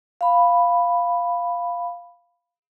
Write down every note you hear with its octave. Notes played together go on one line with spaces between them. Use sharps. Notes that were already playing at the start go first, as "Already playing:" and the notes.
F5 B5